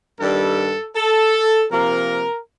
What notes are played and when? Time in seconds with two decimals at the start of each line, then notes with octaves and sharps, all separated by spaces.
0.20 G2 D#3 G3 A4
0.96 A4
1.72 C3 F3 A#3 A#4